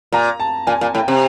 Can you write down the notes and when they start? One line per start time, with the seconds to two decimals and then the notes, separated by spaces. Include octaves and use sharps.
0.12 A#2 A#5
0.40 A5
0.67 A#2 G#5
0.81 A#2
0.94 A2 G5
1.08 C3